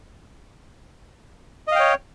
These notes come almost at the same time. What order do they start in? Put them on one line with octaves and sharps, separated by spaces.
D#5 F5 G5 C#5